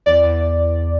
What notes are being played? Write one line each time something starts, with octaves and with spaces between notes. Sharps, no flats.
E2 D5
E2